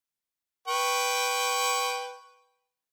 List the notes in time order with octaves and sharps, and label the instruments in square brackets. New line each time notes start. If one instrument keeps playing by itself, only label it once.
[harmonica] B4 G5 C#6